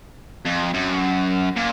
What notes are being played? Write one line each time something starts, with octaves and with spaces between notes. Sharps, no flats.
F2
F#2
A#2